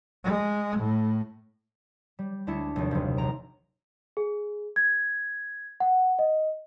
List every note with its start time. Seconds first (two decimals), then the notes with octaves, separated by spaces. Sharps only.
0.24 G#3
0.79 A2
2.19 G3
2.47 D2 G#3 D4 E4 C#7
2.76 F1 D#2
2.91 F#1 C3
3.17 A#1 A#5 D7
4.17 G#4
4.76 G#6
5.80 F#5
6.19 D#5